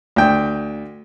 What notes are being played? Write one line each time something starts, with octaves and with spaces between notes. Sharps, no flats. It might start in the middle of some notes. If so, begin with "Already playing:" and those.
D2 G5